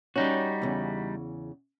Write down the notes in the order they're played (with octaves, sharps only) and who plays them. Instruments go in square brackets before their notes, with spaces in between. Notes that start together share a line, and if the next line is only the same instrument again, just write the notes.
[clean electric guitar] G3 D#4 F#4 [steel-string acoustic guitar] C#4
[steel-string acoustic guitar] E2 C#3